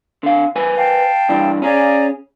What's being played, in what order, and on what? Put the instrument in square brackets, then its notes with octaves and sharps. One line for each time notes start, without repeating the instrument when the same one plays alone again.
[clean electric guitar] D3 F5
B4 C5 G#5
[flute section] F5 G5 A5
[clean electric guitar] G2 E3 D4
[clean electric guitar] C#4 G#4 [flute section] D5 G#5 A#5